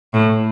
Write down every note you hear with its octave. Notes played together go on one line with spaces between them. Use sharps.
A2